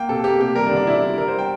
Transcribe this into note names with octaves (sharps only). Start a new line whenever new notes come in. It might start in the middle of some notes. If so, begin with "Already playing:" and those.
Already playing: A#3 G5
C3 A4
A#3 G4
C3 G4
G3 A#4
D4
D3
D4
D3 E4
E4
G3
G3 A#4
C5
G5